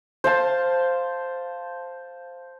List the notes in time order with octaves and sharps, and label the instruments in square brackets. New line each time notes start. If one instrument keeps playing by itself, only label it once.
[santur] C5 F5 A5